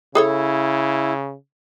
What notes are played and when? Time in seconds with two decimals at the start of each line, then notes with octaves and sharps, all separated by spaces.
0.15 C#3 E4 G#4 A4 C#5